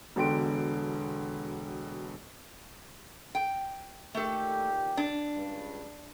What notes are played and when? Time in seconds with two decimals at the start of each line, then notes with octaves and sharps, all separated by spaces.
0.16 E1 B2 D3 G5 C6 D7
3.35 G5
4.15 A#2 D#3 A3 G4 A4
4.97 D4
5.35 C#2 G2